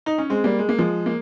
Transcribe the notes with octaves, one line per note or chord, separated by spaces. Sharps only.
D#4
C#4
G#3 C4
G3 A#3
G#3
A#3
F3 G#3
A#3